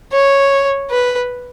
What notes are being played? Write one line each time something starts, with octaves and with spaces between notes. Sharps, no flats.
C#5
B4